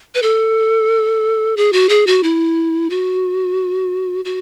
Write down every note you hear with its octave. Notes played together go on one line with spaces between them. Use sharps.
B4
A4
G#4
F#4
G#4
F#4
E4
F#4
F#4